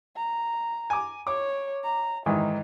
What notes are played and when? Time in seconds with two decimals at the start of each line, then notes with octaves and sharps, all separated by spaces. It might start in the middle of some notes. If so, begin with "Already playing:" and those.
0.17 A#5
0.90 G#5 D6
1.27 C#5 D6
1.84 A#5
2.26 G#2 D#3 E3 D#4